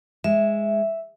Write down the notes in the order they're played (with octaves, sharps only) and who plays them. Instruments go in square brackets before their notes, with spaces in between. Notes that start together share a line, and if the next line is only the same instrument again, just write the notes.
[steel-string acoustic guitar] G#3 [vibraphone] E5